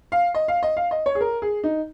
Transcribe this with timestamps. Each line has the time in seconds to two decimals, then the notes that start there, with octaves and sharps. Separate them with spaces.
0.12 F5
0.35 D#5
0.48 F5
0.63 D#5
0.77 F5
0.91 D#5
1.06 C#5
1.15 G#4
1.21 A#4
1.42 G#4
1.64 D#4